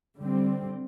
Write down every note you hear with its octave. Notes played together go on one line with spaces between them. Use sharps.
D3 G3 C4